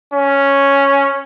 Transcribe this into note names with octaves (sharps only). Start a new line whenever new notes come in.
C#4